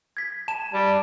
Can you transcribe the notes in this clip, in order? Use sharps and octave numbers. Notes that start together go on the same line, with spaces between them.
G#6 B6
A5 E7
G3